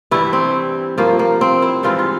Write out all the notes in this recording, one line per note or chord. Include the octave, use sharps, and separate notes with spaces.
G2 E3 G3 E4
C4
G2 F3 A#3
A#3
C4
E4
G#2 E3 G3 F4
F4